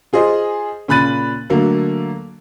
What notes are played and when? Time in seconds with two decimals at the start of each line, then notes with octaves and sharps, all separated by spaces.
0.13 F4 G#4 C5 D#5
0.88 A#2 C#3 B5 F#6 A6 D#7
1.50 D3 F#3 A3 A#3